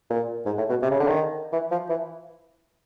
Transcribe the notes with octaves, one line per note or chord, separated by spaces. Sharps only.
A#2
G#2
A2
B2
C3
C#3
D3
D#3
E3
F3
E3